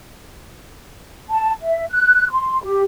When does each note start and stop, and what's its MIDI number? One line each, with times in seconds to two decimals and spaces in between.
1.30 1.51 81
1.62 1.85 76
1.91 2.30 90
2.30 2.63 84
2.63 2.82 67